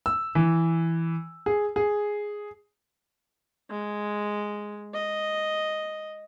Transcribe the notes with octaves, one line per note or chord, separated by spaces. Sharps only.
E6
E3
G#4
G#4
G#3
D#5